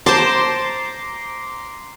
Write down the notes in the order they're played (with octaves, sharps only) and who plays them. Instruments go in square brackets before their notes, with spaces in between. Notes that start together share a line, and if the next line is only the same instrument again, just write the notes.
[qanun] C5 A5 [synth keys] A#5 C6 D6